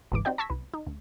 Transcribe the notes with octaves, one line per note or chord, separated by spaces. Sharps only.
G1 C#2 G#2 E3 D6
C4 D#4 F#4 G4 D5 G5
A5 C#6 E6 G#6 A#6 B6
C2 B4
D#4
D2